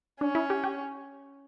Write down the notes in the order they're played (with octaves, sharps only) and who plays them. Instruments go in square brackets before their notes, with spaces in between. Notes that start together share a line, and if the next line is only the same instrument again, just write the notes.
[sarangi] C#4 [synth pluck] D4
[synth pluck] E4
G4
G4